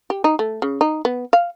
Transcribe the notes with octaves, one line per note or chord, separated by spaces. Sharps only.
G4
D#4
A3
C#3
D#4
B3
F5